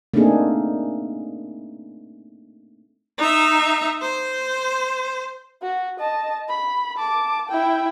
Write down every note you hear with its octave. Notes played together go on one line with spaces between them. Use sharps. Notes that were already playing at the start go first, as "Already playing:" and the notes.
A3 A#3 C4 D4 D#4 G#4
D#4 E5
C5
F#4
D#5 A5
B5
A5 D6
E4 G5